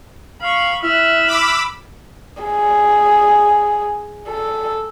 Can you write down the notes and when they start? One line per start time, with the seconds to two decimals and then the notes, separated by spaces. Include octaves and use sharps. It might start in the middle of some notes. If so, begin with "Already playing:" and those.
0.42 F5 B5 C#6
0.83 E4 E5 F6 F#6
1.27 B5 D6 E6
2.42 G#4
4.28 A4